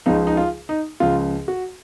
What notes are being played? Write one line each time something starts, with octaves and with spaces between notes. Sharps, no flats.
C#2 C#3 F3 D#4
D#4
F4
D#4
C#2 C#3 F3 F4
F#4